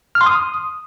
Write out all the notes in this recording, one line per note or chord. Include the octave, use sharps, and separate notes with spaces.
F6
C6
D#6